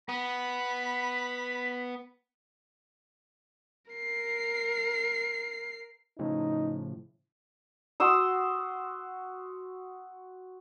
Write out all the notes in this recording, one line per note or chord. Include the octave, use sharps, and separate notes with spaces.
B3 B5
A#4 C7
A2 C#3 F3 D#4
F#4 C6 D#6 E6